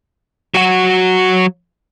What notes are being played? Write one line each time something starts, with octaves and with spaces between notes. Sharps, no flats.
F#3 F#4